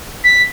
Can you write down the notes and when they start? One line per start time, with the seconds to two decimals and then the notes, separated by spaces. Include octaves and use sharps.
0.24 B6